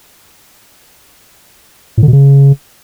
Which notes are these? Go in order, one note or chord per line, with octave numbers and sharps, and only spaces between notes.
A2
D3
B2
C#3